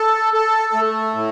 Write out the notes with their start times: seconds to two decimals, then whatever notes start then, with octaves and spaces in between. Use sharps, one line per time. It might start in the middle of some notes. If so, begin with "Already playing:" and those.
Already playing: A4
0.34 A4
0.73 A3
1.14 A2